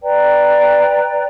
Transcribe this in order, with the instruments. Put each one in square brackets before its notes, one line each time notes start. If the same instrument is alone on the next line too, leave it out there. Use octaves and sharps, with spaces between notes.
[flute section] B4 D5 G5 A#5